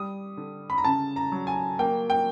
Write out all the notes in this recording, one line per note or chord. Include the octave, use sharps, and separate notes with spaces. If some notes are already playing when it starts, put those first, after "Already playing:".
Already playing: G3 D#6
D3
B5
A#5
C#3 A5
A#5
F#3
G#5
A#3 G5
G5